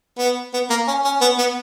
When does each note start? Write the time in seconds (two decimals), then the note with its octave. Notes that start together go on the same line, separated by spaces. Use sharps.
0.18 B3
0.53 B3
0.70 A#3
0.87 C#4
1.05 C#4
1.21 B3
1.38 B3